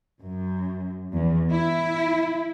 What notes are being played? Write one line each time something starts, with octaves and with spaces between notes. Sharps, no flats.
F#2
E2
E4